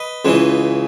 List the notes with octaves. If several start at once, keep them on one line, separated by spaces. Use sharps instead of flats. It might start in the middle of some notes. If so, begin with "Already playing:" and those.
Already playing: B4 D#5
C#2 C#3 E3